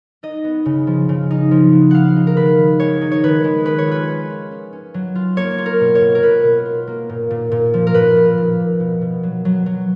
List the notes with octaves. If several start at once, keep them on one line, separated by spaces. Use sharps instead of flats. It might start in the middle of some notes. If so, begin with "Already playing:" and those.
D#4 D#5
B3
C#3
F3
C#3
D#4
F3
B3
G#3 F5 F#5
D#4
A#4
D#3 B4
D#3
G#3 C#5
D#4
C#5
D#3 B4
G#3
C#4 B4
C#5
F4 B4
C#4
F4
C#4
C#4
F#3
F4
A#3 C#5
F4
A#4
B2
C#5
B2
A#4
B2 B4
B2
F4
A#3
A#2
A#2
A#2
F3
A#4
A#2 B4
A#2
A#2
A#2
B2
B2
F#3
F#3
F#3